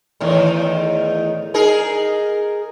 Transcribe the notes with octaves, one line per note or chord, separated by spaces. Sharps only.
E2 A2 D#3
D#4 G#4 A#4